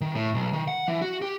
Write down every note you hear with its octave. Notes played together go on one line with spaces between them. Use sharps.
D#3
A2
B1
D#3
F#5
E3
F#4
G4